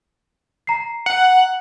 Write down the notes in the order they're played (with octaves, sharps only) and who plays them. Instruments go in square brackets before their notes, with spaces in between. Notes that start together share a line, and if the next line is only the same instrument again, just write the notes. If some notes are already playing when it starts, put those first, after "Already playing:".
[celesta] A#5 C7
[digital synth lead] F#5